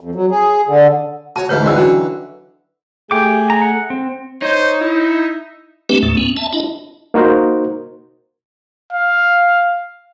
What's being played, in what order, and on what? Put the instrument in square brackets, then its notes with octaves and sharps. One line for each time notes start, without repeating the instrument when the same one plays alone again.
[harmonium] F2
F#3
G#4
D3
[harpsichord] F#4 C#5 [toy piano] A5
[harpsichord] D2 G#2 E3 [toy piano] D#4 B4 C#5
[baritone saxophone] C#2 [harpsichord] D3 E3 [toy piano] F#4 D#5 E6
[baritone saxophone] F#3 [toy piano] C#4 D4
[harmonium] A3 G#4 [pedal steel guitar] G4 G5 D6
[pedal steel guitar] A#5
F#5
C4
[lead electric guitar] D#4 [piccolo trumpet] C5 [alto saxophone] C#5
[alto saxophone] E4 [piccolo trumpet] E5
[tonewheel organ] A3 C4 D4 G4 B4
D#2 A2 A3
B3 C#4
E5 A5
D4 E4 D#5
[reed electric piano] A#3 D#4 F#4 A#4 C5
[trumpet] F5